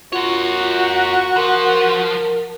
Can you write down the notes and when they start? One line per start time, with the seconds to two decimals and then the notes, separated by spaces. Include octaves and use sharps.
0.12 F4 F#4 A#4 C#5
1.36 F3 A#4